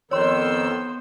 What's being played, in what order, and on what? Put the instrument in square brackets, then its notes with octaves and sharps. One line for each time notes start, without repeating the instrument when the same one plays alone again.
[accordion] F2 D#3 E6 [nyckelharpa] B3 C5 [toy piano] C#5 C6